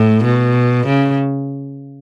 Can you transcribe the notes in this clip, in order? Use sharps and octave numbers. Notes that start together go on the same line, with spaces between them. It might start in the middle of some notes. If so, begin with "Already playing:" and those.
Already playing: A2
B2
C#3